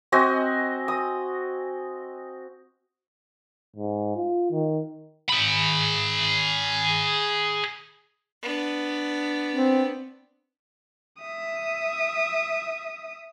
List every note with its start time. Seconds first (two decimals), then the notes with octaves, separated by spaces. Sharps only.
0.12 C4 F#4 D#5 G#5
0.88 D#6
3.76 G#2
4.16 F4
4.51 D#3
5.29 G#4 B5
8.42 B3 D4
9.53 C4
11.21 E5 D#6